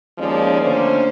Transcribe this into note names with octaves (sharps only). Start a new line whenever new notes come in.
D#2 F3 G#3 C#4 D5
D3 A3 A#3 C#4 C5